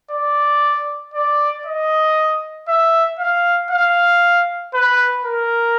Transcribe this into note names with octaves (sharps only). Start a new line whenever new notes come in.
D5
D5
D#5
E5
F5
F5
B4
A#4